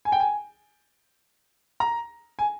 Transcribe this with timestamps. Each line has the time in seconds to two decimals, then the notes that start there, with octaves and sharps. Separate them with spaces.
0.05 G#5
0.12 G5
0.20 G#5
1.80 A#5
2.39 G#5